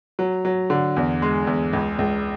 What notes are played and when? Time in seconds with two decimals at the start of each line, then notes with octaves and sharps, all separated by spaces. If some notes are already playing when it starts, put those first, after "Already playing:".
0.19 F#3
0.45 F#3
0.70 D3
0.96 E2
1.22 G#3
1.47 E2
1.73 C#2
1.99 C#2